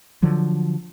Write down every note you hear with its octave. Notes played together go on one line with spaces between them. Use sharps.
D3 F3 F#3